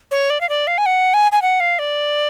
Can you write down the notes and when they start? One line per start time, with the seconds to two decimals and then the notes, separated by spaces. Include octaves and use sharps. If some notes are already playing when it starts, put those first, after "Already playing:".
0.11 C#5
0.30 D5
0.41 F5
0.49 D5
0.67 F5
0.78 G#5
0.86 F#5
1.14 G#5
1.32 G#5
1.42 F#5
1.60 F5
1.79 D5